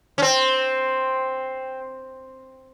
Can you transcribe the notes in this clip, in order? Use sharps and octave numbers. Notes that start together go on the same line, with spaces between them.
C#4
C4